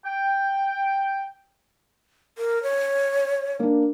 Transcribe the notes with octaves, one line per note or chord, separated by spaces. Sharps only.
G5
A#4
C#5
A#3 D4